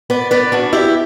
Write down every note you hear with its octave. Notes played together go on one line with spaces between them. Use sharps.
B3 B4 D5
B3 B4 D5
E2 D4 F#4
E2 E4 G4